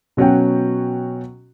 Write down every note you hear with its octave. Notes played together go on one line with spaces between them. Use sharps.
B2 F#3 C#4 F#4 G5